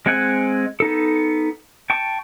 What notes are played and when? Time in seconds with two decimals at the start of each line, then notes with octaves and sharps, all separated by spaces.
0.06 G#3 C4 F#5 G#5 F#6
0.80 B3 D#4 A4
1.90 G5 A5 C#6